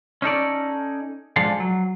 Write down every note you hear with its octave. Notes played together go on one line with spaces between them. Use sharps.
C#4 D#4 A4 D5
F3 G#3 D4 A4 F5
F#3